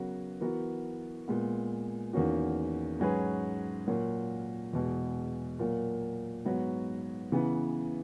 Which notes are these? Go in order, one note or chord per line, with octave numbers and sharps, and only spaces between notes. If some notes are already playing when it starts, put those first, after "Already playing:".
Already playing: C#3 F#3 B3 F#4 A#4
E3 B3 F#4 A#4
A#2 G#3 B3
E2 D#3 A#3 C#4 F#4
G#2 F#3 C#4 G#4 B4
A#2 F#3 A#3
E2 B2 G#3
A#2 F#3 A#3
G#2 F#3 B3 F#4
C#3 E3 B3